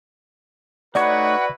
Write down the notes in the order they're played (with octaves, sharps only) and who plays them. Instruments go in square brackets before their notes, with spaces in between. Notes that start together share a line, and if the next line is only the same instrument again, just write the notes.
[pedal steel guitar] A3 D#4 C#5 [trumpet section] E4 F#4 B4 [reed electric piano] D5 [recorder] F#5